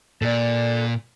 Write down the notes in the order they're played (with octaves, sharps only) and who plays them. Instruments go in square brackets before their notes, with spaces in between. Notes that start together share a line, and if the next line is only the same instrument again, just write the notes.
[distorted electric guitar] A#2 [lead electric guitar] A4 D5